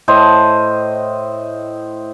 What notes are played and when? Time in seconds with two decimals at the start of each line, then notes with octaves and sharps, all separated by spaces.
0.08 A2 C5 D#5